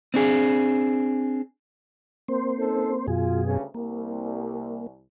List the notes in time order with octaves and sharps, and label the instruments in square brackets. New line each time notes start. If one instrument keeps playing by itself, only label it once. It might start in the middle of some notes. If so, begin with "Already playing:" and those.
[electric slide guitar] C4 D4 G#4
[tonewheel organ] A#3 C4 C5
[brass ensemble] C#4 D#4 A4
[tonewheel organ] F#2 B2 G#4 [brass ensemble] F4 F#4
[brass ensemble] D2 G2 C#3
[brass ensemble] C2 [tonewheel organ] A#3